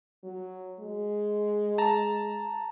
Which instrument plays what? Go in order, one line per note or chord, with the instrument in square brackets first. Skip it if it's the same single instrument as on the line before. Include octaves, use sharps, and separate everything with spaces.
[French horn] F#3
G#3
[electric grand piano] A5 A#5